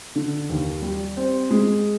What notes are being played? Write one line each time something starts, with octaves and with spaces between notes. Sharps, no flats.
D3
D#2
G3
C4
G#3